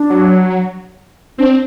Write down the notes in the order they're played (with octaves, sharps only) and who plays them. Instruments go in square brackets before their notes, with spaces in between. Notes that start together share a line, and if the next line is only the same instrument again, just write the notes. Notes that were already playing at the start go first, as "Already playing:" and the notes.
Already playing: [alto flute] D4
[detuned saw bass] F#3
[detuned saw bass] C4 [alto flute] D4